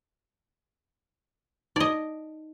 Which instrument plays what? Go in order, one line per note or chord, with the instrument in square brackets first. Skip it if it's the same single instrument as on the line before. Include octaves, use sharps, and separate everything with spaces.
[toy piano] D#4 [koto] D5 D#5